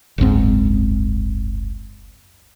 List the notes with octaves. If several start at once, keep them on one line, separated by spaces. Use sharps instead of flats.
F#1 C#2 G#2 C4